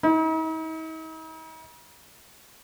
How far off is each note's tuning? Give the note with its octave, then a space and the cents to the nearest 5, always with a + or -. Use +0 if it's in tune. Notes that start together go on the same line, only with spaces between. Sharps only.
D#4 +45